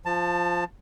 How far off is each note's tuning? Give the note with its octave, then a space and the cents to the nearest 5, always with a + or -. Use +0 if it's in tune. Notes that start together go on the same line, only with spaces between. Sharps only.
F3 +0 A5 +20